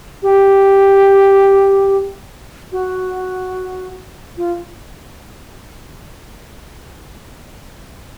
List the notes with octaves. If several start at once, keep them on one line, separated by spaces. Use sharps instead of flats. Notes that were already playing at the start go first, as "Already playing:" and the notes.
G4
F#4
F4